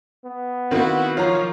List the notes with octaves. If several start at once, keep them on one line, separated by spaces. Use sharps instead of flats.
B3
D#3 A#3 C4 E4 F#4
F3 F4 C#5 A#5